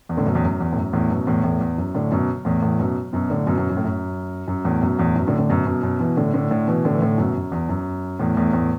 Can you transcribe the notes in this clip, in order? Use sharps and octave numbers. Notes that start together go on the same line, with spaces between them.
E2
A2 D3
F#2 B2
E2 A2
F#2
E2
A2
F#2
E2 A2
F#2 B2
E2 A2
E2 A2
E2
F#2
A2 D3
F#2 B2
E2 A2
E2 A2
F#2 B2
F#2 B2
A2 D3
F#2 B2
F#2 B2
F#2
A2
F#2
F#2
E2 A2
F#2 B2
E2 A2
F#2 B2
A2 D3
A2 D3
F#2 B2
F#2 B2
F#2 B2
B2 E3
A2 D3
A2 D3
A2 D3
B2 E3
A2 D3
E3
A2 D3
F#2 B2
F#2
E2
F#2
E2 A2
E2 A2
E2 A2